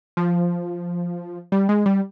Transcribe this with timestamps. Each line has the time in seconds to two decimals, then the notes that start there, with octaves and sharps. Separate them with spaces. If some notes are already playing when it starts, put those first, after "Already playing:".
0.17 F3
1.52 G3
1.69 G#3
1.86 G3